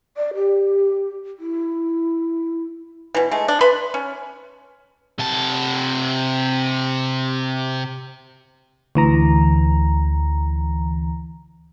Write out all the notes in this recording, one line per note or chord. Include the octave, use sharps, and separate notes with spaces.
D5
G4
E4
B2 E3
G#3 A3
D4
B4 E5 B5 C6
C#4
C3 A5
D2 E3 A#5